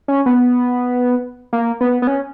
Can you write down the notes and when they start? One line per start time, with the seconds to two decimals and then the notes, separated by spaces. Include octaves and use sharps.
0.08 C#4
0.26 B3
1.53 A#3
1.81 B3
2.02 B3
2.07 C#4